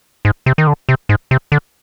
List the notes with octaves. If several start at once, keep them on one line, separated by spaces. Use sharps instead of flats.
G#2
C3
D#3
D3
C3
G#2
C3
D3